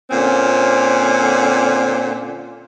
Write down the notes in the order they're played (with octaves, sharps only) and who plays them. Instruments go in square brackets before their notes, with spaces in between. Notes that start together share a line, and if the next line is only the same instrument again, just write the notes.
[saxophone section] A#2 D3 C4 C#4